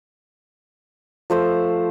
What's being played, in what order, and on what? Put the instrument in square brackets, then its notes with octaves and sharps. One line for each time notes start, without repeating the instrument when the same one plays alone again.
[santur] F3 A3 C5